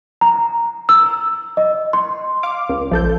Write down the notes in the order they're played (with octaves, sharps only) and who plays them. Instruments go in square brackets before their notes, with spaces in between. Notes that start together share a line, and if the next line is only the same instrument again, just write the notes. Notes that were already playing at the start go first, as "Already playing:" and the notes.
[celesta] A#5
E6
D#5
C6
[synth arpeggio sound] F5 D6
C#2
[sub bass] A#1 [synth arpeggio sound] F3 A4 G6